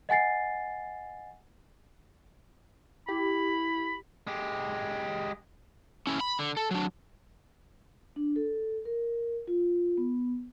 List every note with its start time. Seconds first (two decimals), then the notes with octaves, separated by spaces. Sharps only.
0.09 D#5 F#5 G#5 A6 C7
3.09 E4 G4 B5
4.27 G#3 G4
6.07 C#4 E4
6.21 B5
6.39 D3
6.57 A4
6.71 F#3 D4
8.16 D4
8.36 A4
8.85 A#4
9.47 F4
9.97 B3